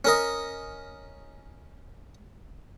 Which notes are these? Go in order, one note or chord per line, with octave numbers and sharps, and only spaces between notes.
C#4 A#4 D#5